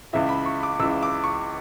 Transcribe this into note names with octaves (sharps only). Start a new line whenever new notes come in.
C#2 C#3 E3 E5
B5
C#6
D6
C#2 C#3 E3 E6
D6
C#6